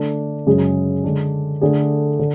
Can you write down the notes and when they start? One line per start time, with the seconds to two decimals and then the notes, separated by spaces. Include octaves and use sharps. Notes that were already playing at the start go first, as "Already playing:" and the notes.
Already playing: D3 A3 D4
0.47 F#2 C#3 G#3 C#4 G#4
1.04 D3 G#3 D4
1.61 D3 A3 D4 G#4
2.19 D3